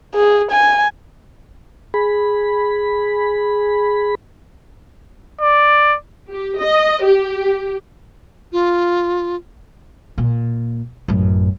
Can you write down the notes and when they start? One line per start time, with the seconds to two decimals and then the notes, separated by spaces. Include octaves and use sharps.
0.14 G#4
0.51 G#5
1.94 G#4 B5
5.41 D5
6.31 G4
6.60 D#5
7.03 G4
8.52 F4
10.18 A#2
11.08 A1 F#2